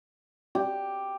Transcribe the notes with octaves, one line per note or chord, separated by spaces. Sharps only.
G4